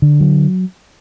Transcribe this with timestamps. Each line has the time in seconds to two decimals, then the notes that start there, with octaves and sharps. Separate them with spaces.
0.02 D3
0.20 F#3